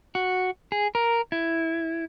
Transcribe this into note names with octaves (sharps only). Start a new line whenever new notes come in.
F#4
G#4
A#4
E4